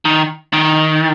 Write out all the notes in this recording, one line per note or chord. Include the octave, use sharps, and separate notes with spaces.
D#3
D#3